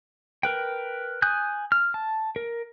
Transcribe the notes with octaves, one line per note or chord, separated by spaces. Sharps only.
A#4 B4 G5
G#5 D#6 F#6 G6
F6
A5
A#4